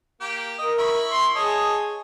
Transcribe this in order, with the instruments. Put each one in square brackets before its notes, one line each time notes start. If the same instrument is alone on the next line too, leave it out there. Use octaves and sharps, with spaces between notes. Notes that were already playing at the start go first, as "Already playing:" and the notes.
[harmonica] A#3 G4
[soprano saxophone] A#4 [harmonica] D#5
[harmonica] E4 B5 C#6
[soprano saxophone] C6
[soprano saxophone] G#4 [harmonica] C#5 D#5 A5